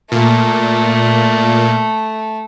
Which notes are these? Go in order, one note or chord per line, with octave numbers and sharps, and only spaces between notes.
A#2 A3